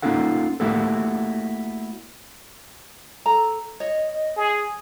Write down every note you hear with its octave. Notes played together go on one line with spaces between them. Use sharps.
A#3 C#4 D#4 F4 A4 F#5
A3 A#3 E4 F#4 G4 A4
A4 A#5
C#5 D#5
G#4